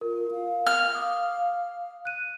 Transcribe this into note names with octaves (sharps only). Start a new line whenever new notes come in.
F4 A#4
F5
F6
D6 D#6
F#6 D#7